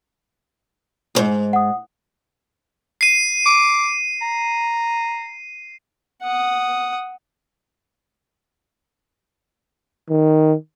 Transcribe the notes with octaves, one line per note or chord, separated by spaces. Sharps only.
D#2 G#2
F#5 D#6
C7 D#7
D6
A#5
F#5 D#6
D#3